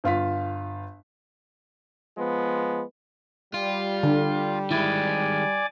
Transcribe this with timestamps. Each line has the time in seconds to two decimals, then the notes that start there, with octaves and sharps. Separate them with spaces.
0.04 G1 F4 F5 B6
2.18 F3 G#3 B3
3.54 G3 F4
4.03 D3
4.71 D#3 G#3 E4 D5 G#5 D6